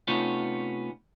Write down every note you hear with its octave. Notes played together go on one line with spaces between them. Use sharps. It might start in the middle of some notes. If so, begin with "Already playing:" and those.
C3 A3 B3 C#4 D#4 F4